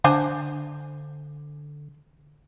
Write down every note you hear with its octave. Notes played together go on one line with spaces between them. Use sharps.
D3 D4 C5 G#5